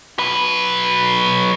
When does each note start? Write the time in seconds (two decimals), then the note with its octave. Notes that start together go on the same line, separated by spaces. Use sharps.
0.19 F#3 B4